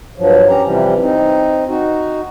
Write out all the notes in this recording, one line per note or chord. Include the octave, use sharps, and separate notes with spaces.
G2 F3 F#3
C#4 G4 A#5
C3 E3 F3 G3
C4 D#4
D#4 F#4